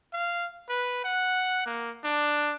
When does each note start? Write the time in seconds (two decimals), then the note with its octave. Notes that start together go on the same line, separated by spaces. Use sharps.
0.13 F5
0.69 B4
1.04 F#5
1.66 A#3
2.04 D4